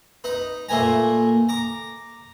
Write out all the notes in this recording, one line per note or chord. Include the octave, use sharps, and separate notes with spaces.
D#4 B4
A#2 A3 B4 G#5 A#5
A#5 D6